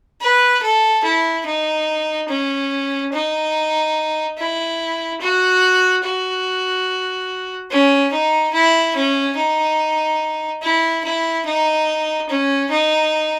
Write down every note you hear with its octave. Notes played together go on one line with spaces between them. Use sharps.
B4
A4
E4
D#4
C#4
D#4
E4
F#4
F#4
C#4
D#4
E4
C#4
D#4
E4
E4
D#4
C#4
D#4